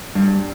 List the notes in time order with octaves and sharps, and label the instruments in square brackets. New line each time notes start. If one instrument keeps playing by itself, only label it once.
[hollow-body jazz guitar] G2